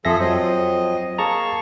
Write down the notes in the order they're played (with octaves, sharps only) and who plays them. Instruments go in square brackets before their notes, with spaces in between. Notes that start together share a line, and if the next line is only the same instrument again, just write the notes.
[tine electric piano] F2 E5 A#6 [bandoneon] F3 G#4 A4
[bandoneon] F2 D#5 [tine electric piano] F#3 C5
[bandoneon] A#3 C#6 [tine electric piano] G#4 A5 A#5